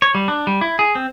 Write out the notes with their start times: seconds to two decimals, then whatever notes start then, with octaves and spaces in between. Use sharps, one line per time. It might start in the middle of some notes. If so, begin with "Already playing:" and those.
0.02 C#5
0.15 G3
0.28 D4
0.47 G3
0.61 E4
0.79 G#4
0.95 C4